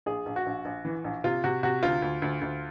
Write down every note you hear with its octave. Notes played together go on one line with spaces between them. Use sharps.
A#1 G#4
A#1
F#4
A#1
A#1
E3
A#1
C3 F4
C3 F#4
C3 F#4
D2 F4
D2
D2
D2